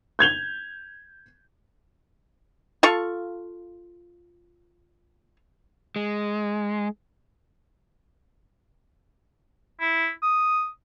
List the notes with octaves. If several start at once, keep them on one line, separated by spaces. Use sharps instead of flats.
G6 G#6 F7 G7
F4 A4 F5 C#6
G#3
E4
D#6